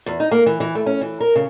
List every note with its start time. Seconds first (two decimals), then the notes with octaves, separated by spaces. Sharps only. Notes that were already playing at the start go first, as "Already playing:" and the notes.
0.06 E2
0.20 D#4
0.31 A#3
0.46 E3
0.60 E3
0.75 A3
0.86 C#4
1.01 E3
1.20 A#4
1.35 C#3